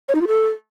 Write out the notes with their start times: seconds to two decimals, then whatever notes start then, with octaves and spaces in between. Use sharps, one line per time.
0.09 C#5
0.15 D#4
0.21 F4
0.27 A4